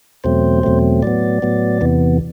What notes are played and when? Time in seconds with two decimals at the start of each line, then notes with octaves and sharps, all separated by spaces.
0.24 E2 B2 F#3 A3 C4 C5
0.63 E2 B2 F#3 A3 C4
1.03 A2 F#3 B3 D5
1.42 A2 F#3 B3
1.81 E2 C3 E3 B3